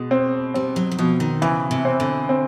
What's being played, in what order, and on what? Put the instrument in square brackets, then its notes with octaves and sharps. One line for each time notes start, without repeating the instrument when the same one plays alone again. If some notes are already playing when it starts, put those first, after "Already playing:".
Already playing: [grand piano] B2 [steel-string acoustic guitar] G#3
[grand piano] C4
[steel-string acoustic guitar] G3 [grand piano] C4
[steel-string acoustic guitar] F#3
F#3
[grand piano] B2 [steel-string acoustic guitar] F3
[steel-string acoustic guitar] D#3
[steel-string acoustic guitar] C#3 [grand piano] E3
[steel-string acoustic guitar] C3
[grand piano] C4
[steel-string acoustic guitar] D3
[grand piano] C4